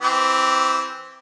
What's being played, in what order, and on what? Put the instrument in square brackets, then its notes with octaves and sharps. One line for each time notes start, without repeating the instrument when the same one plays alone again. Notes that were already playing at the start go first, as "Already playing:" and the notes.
[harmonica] E3 C4 G4